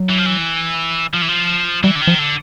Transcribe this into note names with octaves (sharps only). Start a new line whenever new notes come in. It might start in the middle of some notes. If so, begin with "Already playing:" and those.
Already playing: F#3
E3
F3
E3
F3
E3
F3
E3 G3
D3
D#3
F3
D3